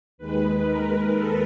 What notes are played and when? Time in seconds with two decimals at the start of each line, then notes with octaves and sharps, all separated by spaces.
0.18 D#2 D#3 G#3 B4
0.65 A#4
1.12 A4